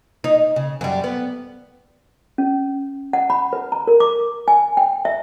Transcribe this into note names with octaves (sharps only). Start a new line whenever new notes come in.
D#4
C#3
F#2 G3
B3
C#4
F#5
B5
B4
A#5
A#4
D6
G#5
G5
E5